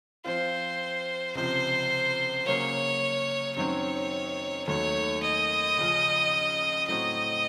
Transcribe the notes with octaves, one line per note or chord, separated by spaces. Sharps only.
F3 C4 F4 C5
C#2 C3 F3 C5
C#3 F#3 A#3 C#5
F#2 D#3 F#3 C4 C#5
D#2 D#3 F#3 A3 C#5
D#5
C#2 C#3 F3
A2 F#3 C4 F#4 D#5